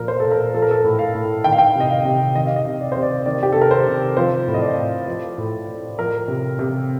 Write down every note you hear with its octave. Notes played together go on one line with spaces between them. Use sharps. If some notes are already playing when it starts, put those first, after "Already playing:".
Already playing: A#2 F3 A#4
C5
A#2 A4
A#4
F3 A4
A#4
A4
A2
F5
A2
D#3 G5
F5
G5
C3 D#5
F5
C3
D#3 D#5
F5
D#5
C3
D5
C3 C5
D5
D#3 D5
G4
C3 A4
A#4
C5
C3
F3 C5
A2
D#5
D5
A2
F3
A2
A2
F3 A#4
C3
C3